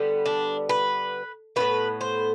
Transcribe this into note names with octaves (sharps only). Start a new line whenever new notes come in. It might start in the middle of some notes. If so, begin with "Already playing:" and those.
Already playing: D3 G3 B3
D4
B4
A2 E3 B3 B4
C5